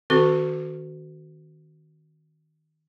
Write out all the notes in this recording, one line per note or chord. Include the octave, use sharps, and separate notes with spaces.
D#3 C4 F#4 A4